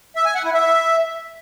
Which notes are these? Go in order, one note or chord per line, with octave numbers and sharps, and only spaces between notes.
E5
G#5
F#5
E4
E5